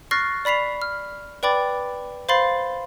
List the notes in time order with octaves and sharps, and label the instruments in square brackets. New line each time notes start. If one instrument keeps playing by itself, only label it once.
[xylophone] C#6 F6 F#6 A6 A#6 C7
D5 B5 B6 C7 F7
F6
B4 D5 G5 B5 D6 A6
C5 F5 B5 C6 A6 C7